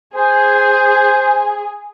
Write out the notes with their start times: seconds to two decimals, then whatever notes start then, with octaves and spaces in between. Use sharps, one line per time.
0.16 G#4 C5